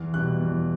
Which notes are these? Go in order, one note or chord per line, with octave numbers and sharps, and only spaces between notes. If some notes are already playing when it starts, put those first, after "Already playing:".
Already playing: E2
B2 G3 F#6
E2